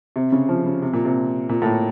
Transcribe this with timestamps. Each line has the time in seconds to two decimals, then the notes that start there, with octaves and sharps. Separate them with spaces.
0.16 C3
0.32 C#3
0.49 F3
0.66 C#3
0.82 C3
0.93 A#2
1.05 C3
1.49 A#2
1.62 A2
1.66 A#2